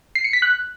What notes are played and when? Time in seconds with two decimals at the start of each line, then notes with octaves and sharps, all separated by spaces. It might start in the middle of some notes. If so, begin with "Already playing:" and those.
0.15 C7
0.24 C#7
0.33 B6
0.42 F#6